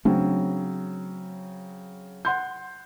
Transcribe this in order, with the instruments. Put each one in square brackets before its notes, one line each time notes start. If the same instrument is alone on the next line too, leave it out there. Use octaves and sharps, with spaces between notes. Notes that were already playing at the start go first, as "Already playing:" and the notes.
[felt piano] C#3 F#3 C4 [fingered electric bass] A3 D4
[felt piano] F#5 C6 G6